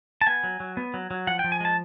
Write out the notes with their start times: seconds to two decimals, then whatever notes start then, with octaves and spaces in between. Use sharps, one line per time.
0.21 A5
0.27 B3 G#5
0.44 F#3
0.60 F#3
0.77 B3
0.94 F#3
1.11 F#3
1.27 F3 F#5
1.39 G5
1.44 F3
1.52 G#5
1.60 G#3 A5